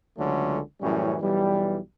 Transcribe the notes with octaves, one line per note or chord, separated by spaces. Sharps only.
C#2 D3 F#3 A3 C#4
F#2 A2 E3 G3 C#4
B1 E3 G3